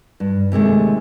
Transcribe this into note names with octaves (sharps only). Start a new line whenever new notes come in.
G2
D#2 C3 G#3 A3